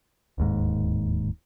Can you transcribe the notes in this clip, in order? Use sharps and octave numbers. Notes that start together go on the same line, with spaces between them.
D1 D#2 G#2